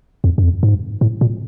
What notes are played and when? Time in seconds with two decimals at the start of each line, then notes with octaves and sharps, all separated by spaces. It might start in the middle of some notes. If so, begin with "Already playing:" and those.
0.24 F2
0.38 F#2
0.43 F2
0.63 G#2
1.01 A2
1.21 A#2